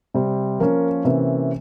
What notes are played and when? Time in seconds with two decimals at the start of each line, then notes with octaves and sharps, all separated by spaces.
0.14 C3 G3 C4
0.59 F3 A#3 C#4 A#4
1.05 C3 E3 A#3 C#4